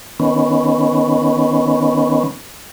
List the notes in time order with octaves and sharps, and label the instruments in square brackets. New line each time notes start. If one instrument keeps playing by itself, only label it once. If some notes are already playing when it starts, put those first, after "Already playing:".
[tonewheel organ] D#3 B3 C#4